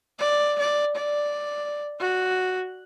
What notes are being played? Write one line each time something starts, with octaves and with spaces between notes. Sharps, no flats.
D5
D5
D5
F#4